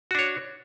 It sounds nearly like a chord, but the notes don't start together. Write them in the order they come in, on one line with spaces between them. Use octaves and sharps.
F#4 D4 C#5